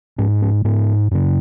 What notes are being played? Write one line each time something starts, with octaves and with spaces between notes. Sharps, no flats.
G#2 C#4
C#4
G#2 B3
F#2 C#3